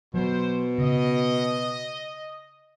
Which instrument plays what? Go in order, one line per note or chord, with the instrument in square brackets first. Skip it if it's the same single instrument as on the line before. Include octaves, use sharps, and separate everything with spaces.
[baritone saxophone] B2 [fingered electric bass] F#3 [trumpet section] C5
[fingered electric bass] C#3 [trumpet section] D#5